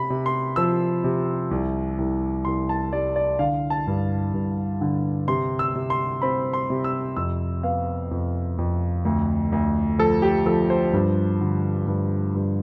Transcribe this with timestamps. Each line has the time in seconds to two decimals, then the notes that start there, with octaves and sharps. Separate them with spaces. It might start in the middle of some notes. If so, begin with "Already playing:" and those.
Already playing: C3 B5
0.10 C3
0.26 C6
0.56 F3 E6
1.04 C3
1.51 C2
1.98 C2
2.45 C2 C6
2.69 A5
2.92 G3 D5
3.16 D5
3.39 D3 F5
3.70 A5
3.87 G2
4.34 G2
4.81 D3
5.28 C3 C6
5.59 E6
5.75 C3
5.90 C6
6.22 C4 B5
6.53 C6
6.70 C3
6.84 E6
7.16 F2 E6
7.63 B3 F5
8.11 F2
8.58 F2
9.05 D2
9.52 D2
9.99 F3 A4
10.22 G4
10.46 F3 A4
10.70 C5
10.93 G2
11.41 D3
11.87 G2
12.35 G2